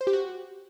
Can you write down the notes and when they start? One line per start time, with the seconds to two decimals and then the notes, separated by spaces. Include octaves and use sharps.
0.01 C5
0.07 G4
0.13 F#4